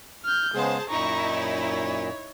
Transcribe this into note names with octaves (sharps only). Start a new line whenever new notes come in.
F6 G6
C#3 G#3 B3 G#4 C5 A5
F#2 A#2 D#4 E4 A#5 C#6
C#5